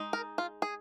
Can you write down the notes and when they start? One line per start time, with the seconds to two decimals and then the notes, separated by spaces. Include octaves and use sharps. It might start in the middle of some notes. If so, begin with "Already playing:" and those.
Already playing: G#3 D#4
0.13 A#4
0.38 F4
0.62 G#4